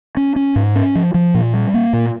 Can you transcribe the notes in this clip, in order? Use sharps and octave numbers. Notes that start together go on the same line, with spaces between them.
C#4
C#4
G#2
C#4
F3
F3
A#2
G3
A#3
A#2